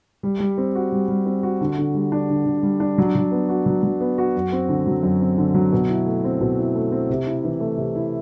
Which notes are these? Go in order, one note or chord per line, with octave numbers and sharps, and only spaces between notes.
G3
G3
C4
F#4
G3
G3
C4
F#4
D3
D3
G3
D4
D3
D3
G3
D4
F#3
F#3
B3
F#4
F#3
F#3
B3
F#4
F#2
C4
D3
F#3
F#2
C4
D3
F#3
B2
E4
A3
C4
B2
E4
A3
C4
C3
E4
E3
A3
C3
E4